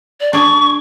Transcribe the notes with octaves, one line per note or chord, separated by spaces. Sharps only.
D5
D4 G#4 C#6